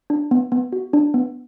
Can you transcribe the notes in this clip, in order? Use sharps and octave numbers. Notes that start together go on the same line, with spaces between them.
D4
B3
B3
F#4
D4
B3